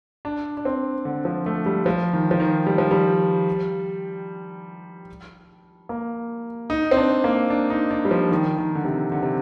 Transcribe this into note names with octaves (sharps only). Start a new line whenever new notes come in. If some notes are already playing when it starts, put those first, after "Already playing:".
D4
D4
C4
D3
F3
A3
G3
F3
D#3
F3
D#3
G3
F3
G3
A#3
D#4
C4
D4
A#3
D4
D#4
D4
G3
F3
D#3
D#3
D3
C3
D3
C3